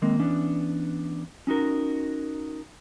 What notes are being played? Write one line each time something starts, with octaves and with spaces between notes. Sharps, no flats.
D#3 G#3 A#3 C4
E3 B3 C#4 D4
C#4 D#4 F#4 A#4